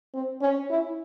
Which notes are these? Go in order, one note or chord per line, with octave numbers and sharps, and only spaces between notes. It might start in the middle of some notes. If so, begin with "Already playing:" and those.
C4
C#4
E4